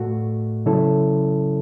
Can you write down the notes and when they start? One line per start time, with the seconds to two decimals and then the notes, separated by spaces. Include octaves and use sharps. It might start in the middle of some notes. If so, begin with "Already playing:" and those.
Already playing: A2 A3 F#4
0.66 C#3 F#3 C#4 E4 A4